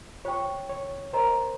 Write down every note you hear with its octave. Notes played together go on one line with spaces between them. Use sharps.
F4 C5 C#5 G5 C#6
C#5
A#4 C5 D#5 A#5